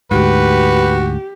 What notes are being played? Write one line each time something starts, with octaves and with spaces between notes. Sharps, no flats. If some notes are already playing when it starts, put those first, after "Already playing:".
D2 G#2 F#4 G4 B4